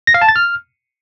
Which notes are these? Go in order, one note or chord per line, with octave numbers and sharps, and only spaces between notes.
A#6
F5
A5
A6
F6